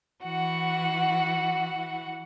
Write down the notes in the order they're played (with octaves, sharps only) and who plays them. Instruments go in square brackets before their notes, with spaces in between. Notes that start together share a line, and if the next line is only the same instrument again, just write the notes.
[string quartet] E3 F#4 F#5